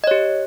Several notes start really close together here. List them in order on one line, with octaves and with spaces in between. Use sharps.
D#5 C#5 G4